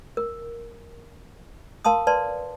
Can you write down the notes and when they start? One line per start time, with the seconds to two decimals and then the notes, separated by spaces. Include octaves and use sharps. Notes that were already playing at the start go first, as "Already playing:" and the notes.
0.17 A#4
1.85 A#4 F5 A5 C6 D#6
2.07 B4 D5 A5 C6